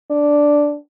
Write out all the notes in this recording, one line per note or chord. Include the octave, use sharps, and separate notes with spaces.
D4